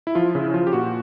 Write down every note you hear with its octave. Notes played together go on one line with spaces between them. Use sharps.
E4
F3 F4
C#3 E4
F3 F4
G4
A#2 F#4